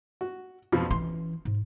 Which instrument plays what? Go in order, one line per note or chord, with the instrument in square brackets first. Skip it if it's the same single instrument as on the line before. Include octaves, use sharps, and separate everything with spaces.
[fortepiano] F#4
F2 B2 F3
[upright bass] E3 C#4 [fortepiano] C6
[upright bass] G#2